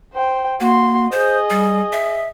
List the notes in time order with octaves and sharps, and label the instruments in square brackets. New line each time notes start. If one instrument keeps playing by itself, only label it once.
[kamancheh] C5 G5
[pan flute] A#3 [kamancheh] F#4 C6
[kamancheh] G#4 D#5 [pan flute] C5
[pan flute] G3
E5